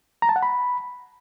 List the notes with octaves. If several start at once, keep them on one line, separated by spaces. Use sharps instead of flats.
A#5
A5
F#5
B5